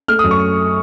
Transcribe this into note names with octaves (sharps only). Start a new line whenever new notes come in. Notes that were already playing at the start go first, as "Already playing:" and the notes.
A3 F6
D#6
F#2
C#6